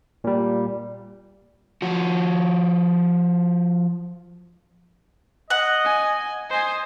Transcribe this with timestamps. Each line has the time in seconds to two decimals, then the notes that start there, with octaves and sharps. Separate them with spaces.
0.24 A#2 G3
1.82 F3 F#4
5.50 D#5 F#5
5.85 G#5
6.50 C5 D#5 G#5